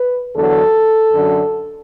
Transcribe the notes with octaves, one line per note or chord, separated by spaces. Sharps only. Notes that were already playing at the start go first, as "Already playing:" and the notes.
Already playing: B4
E2 D3 F#3 A4
F#2 D3 F#3